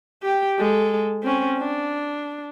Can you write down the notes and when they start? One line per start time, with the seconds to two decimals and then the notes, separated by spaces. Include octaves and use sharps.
0.23 G4 G5
0.59 G#3 A4
1.23 C4 C#4
1.59 D4